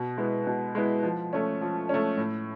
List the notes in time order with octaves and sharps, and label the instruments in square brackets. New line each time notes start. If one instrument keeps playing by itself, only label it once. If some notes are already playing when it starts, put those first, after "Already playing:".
Already playing: [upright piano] B2
G#3 B3 E4
B2
G#3 B3 E4
F3
A3 C#4
F3
A3 C#4
A2